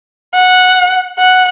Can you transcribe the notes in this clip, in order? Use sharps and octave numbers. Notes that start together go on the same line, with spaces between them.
F#5
F#5